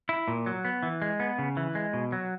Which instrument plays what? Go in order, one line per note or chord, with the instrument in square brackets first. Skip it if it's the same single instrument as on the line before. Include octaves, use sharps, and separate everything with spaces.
[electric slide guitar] E4
A#2
F#3
B3
E3
G#3
B3
C#3
E3
G#3
B2
F#3